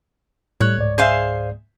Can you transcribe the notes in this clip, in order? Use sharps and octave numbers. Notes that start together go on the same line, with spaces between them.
A2 G3 C#5 F#6
C#2 G#2 D5
G#4 C5 E5 F5 G#5 G6